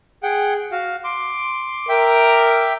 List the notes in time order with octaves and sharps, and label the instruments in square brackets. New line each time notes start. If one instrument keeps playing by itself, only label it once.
[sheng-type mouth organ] G#4 F#5 G5
F#4 F5
C6 D6
[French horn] A#4 [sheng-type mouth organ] E5 G5 D6